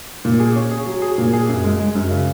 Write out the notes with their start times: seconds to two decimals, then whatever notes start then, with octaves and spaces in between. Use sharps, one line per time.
0.25 A#2
0.40 G#4
0.56 C#4
0.71 G#4
0.87 F#3
1.02 G#4
1.18 A#2
1.33 G#4
1.48 F#2
1.64 G#3
1.79 G#3
1.95 F#2
2.10 C#3